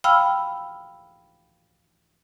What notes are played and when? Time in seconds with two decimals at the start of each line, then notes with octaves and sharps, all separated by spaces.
0.04 F5 G5 B5 E6 F6